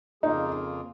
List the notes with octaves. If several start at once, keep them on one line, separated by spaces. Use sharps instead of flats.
F2 C#3 A#3 D#4 F4 G#4